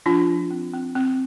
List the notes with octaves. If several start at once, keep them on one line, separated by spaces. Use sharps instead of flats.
F3 D4 F4
F3
C4
C4
C4